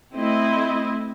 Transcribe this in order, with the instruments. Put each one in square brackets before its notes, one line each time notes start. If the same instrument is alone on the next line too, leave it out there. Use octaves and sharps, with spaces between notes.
[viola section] A3 C4 E4 D#5